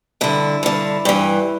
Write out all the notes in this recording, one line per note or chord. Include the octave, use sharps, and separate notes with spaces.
G2 D3 E4
G2 D3
G2 E3